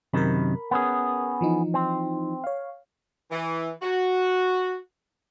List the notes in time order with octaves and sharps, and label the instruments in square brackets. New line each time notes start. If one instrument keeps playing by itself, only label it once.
[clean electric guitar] F#2 C3 D#3 [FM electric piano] A#4 B5
[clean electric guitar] B3 C#4 G#4
[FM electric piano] E3 F3 D#4
[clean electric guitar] C4
[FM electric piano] C#5 F5
[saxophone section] E3
F#4